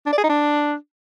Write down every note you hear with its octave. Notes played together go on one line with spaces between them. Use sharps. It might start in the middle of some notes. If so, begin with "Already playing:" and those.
D4
D5
G#4
D#4
D4